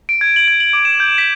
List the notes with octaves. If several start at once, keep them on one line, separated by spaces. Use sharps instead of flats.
D7
G#6
F#7
G#6
F#7
D6
E7
G6
B6